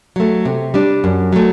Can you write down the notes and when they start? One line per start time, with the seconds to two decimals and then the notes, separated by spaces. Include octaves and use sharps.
0.16 F#3 A3
0.45 C3
0.74 G3 D4
1.04 F#2
1.33 F#3 A3